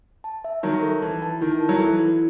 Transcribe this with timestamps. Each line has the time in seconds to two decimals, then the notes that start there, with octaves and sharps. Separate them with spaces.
0.24 A5
0.44 E5
0.63 D#3 F#3 A5
0.82 A4
1.02 E3 E4
1.22 A5
1.41 D#3 E4
1.61 E4
1.69 F#3
1.80 E3 A4
2.00 E4